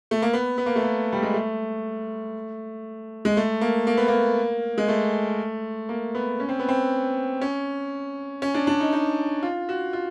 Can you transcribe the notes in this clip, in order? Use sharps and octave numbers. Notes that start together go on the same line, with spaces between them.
A3
A#3
B3
B3
A#3
A3
A#3
G3
G#3
A3
G#3
A3
A#3
A#3
B3
A#3
G#3
A3
A#3
B3
C#4
C4
B3
C4
C#4
C#4
D4
D4
D#4
D#4
F4
F#4
F4